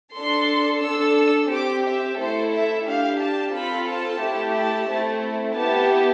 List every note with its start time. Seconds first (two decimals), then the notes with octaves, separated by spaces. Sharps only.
0.15 D4 A4 C6
0.83 D4 A4 E6
1.50 C4 G4 D6
1.85 E5
2.18 A3 E4 A4 C5
2.52 E5
2.85 D4 G4 F5
3.19 A5
3.53 C4 F4 A4 B5
3.87 A5
4.21 A3 E4 G4
4.54 A5
4.89 A3 C4 E4
5.56 B3 E4 G4 A5